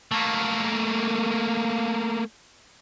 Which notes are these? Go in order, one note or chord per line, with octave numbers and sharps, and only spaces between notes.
A3 A#3